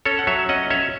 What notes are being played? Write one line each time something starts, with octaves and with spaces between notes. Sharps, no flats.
C#4 A4 C#5
F#5
F#3 C#5 E5
C#4 D#5 F#5
C#4 C#5 E5